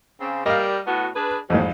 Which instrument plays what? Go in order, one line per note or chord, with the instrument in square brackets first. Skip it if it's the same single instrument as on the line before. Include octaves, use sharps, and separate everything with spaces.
[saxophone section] C#3 C4
[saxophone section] G3 A#4 [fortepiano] D#5 F5
[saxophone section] A2 B3 F#4
D4 G#4 B4
[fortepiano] G#1 F2 [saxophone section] A2 C3 D#4